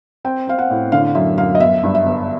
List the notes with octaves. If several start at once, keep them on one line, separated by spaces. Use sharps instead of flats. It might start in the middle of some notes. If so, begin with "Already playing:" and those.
C4 G5
C4 F5
F#5
A2
D3 F5
F#2 E5
F#2 F5
D#5
G1 E5
G2
E5
G1